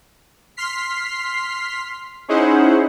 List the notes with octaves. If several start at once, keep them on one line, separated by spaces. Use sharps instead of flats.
C6 F6 B6 C7
C#4 D#4 E4 G#4 C5 F#5